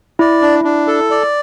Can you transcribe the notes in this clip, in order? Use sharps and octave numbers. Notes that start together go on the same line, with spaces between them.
E4 D5
D4
D4
A4
D5